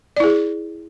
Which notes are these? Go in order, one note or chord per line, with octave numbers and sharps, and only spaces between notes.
E4 G#4 D5